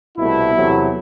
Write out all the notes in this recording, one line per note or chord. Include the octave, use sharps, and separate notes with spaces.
C2 B2 A3 E4
E2 C3 F#3 A3